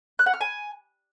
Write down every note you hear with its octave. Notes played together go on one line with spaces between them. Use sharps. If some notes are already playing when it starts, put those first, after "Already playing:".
F#6
F#5
F6
G#5